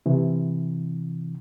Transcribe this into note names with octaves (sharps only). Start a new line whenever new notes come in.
C3 E3